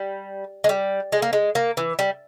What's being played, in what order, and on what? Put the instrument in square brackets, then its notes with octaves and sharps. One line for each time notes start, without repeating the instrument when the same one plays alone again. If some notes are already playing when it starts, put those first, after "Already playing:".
Already playing: [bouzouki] G3
G#3
G3
G#3
A#3
G#3
A#3
E3
G3